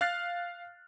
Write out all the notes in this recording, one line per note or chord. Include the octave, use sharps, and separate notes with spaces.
F5 F6 F#6 A6 C7